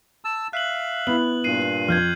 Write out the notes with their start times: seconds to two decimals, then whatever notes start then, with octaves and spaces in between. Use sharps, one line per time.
0.25 A5 E6
0.53 E5 F5 F#6 F#7
1.07 B3 E4 F#7
1.44 G2 A#2 C7 D#7
1.88 F2 F6 G6 G#6